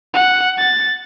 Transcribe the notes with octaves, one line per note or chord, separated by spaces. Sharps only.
F#5
A6